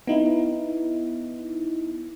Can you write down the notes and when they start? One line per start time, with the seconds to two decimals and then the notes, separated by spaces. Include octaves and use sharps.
0.07 B3 D#4 E4